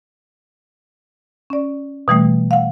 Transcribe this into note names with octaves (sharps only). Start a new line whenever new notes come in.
C#4 D5
B2 E3 G3 A3
F5 F#5